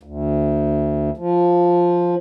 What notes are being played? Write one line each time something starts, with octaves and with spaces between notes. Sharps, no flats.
D2
F3